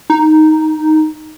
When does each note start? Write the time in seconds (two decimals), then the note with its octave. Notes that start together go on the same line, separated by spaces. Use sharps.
0.10 D#4